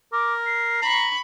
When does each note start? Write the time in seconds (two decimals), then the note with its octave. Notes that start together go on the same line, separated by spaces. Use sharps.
0.13 A#4 D6
0.46 C7
0.82 A#5 B5 C#6